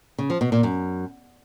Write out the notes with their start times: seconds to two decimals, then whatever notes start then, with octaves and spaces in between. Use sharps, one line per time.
0.18 C#3
0.30 F3
0.41 B2
0.52 A#2
0.63 F#2